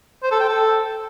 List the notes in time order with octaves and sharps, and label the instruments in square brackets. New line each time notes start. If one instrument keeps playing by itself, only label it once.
[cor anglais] C5
A4
G5
A4